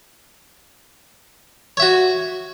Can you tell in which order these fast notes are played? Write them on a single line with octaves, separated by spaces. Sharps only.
C#5 E5 F#4